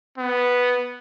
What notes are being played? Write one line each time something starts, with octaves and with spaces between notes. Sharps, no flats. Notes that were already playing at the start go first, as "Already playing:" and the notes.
B3